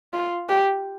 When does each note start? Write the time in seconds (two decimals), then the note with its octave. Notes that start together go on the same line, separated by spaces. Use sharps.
0.13 F4
0.49 G4